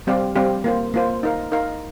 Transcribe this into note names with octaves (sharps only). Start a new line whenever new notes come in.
G3 C4 G4 D5 F5
G3 C4 G4 D5 F5
A#3 F4 C5
A#3 F4 C5
D#4 A#4 F5
D#4 A#4 F5